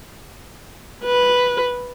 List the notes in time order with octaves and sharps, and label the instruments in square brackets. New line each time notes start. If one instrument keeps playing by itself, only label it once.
[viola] B4